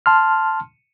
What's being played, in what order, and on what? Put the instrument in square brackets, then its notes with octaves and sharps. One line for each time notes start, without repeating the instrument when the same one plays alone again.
[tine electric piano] A5 C6 F6